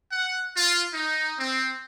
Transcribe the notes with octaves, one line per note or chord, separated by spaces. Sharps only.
F#5
F4
D#4
C4